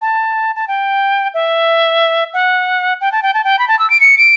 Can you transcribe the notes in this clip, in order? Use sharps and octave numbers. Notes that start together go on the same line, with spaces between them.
A5
A5
G5
E5
F#5
G5
A5
G5
A5
G5
B5
A5
E6
D7
C#7
D7